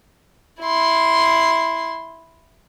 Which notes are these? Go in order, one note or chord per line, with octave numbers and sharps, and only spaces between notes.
E4 C6